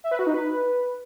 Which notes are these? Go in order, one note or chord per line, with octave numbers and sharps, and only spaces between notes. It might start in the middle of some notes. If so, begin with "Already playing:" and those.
E5
B4
F#4
D#4
B4